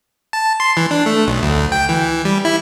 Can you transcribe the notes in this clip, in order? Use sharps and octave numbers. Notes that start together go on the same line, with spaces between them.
A5
C6
E3
D4
A3
B1
D2
G5
E3
G3
E4